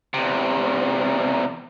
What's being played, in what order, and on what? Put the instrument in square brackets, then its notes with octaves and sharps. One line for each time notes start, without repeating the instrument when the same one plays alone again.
[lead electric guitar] E2 C3